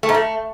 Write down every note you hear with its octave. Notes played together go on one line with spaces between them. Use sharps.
A3
G#2
A3